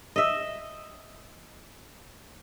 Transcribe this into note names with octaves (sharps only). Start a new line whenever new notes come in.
D#5 E5